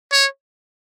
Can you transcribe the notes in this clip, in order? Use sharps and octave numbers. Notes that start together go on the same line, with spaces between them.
C#5